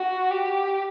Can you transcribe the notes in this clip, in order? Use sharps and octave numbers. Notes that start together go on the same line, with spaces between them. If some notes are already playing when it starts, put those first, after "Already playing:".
Already playing: F#4
G4